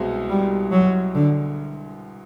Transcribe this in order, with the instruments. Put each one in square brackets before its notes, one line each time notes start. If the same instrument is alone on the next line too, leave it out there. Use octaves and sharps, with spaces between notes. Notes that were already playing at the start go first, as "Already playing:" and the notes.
Already playing: [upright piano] C2 B2 G#3 C4
[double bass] G3
F#3
D3